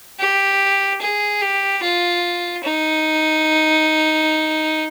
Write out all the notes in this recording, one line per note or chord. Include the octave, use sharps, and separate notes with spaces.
G4
G#4
G4
F4
D#4